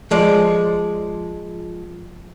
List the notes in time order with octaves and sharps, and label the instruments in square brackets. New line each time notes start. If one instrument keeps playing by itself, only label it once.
[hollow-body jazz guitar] F3 G#3 D5